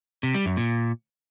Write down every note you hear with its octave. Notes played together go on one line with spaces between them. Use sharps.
C3
G3
F#2
A#2